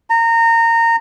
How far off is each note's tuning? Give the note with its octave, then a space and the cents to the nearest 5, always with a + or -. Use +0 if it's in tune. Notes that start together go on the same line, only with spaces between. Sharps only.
A#5 -25